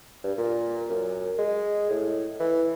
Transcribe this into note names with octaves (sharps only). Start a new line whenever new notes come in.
G2
A#2
F#2
G#3
A2
E3